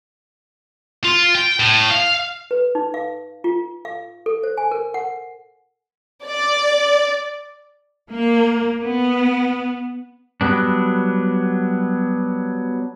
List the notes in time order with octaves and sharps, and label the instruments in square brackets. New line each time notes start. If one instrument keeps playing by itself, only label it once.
[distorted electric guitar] F4
G5
A2
F5
[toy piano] B4
D#4
F5
F4
F5
A4
C5
G#5
A#4
F#5
[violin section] D5
[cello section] A#3
B3
[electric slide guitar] F#3 G3 B3 D4